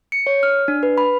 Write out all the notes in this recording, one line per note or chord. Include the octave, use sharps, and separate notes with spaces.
C#7
C#5
F6
D4
B4
B5